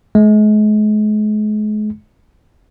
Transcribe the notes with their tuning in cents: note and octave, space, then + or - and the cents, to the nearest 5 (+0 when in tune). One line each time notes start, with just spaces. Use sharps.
G#3 +40